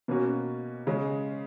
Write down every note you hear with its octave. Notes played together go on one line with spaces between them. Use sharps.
B2 A#3 C#4 F#4
C#3 G#3 C#4